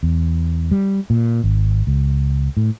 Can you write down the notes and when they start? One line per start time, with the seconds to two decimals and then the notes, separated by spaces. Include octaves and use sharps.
0.03 E2
0.71 G3
1.10 A#2
1.44 G#1
1.87 C#2
2.57 A2